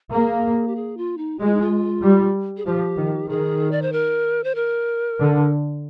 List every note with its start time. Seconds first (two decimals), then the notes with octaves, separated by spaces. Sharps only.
0.12 A#3 G#4
0.68 G4
0.76 G#4
0.97 F4
1.18 D#4
1.39 G#3 G4
1.46 F4
1.54 D#4
1.61 F4
2.03 G3
2.57 G#4
2.66 F3 G4
2.97 D#3
3.28 D#3 G#4
3.71 D5
3.82 C5
3.92 A#4
4.44 C5
4.55 A#4
5.19 D3